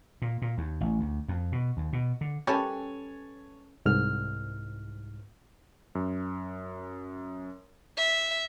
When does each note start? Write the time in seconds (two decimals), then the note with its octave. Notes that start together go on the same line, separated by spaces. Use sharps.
0.22 A#2
0.42 A#2
0.58 D#2
0.81 A1
0.99 D2
1.28 F2
1.52 B2
1.77 D#2
1.93 B2
2.21 D3
2.47 G3 C#4 G4 A4 B4 C#5 G#5 A5
3.85 C2 G#2 F6
5.95 F#2
7.98 E5